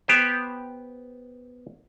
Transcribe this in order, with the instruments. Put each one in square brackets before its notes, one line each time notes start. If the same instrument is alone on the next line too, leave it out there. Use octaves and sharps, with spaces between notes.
[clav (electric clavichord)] B3 G4 C5